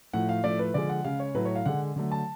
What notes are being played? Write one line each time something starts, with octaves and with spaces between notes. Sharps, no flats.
A2 F3 A3 F#5
F5
A2 F3 A3 D5
B4
D3 F3 G#3 D5
F#5
C#3 G#3 F5
C#5
A2 F#3 A3 B4
C#5
F5
D3 G#3 F#5
D3 F#3 A3
A5